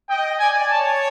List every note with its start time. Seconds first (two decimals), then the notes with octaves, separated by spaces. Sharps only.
0.09 D#5 G5
0.40 D5 G#5
0.70 C#5 A5